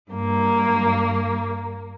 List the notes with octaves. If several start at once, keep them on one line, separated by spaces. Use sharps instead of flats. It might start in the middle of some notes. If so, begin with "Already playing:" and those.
G2 A#3